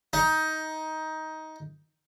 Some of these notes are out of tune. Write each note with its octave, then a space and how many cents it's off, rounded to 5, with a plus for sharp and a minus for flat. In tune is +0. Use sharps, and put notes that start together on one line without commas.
D#4 +15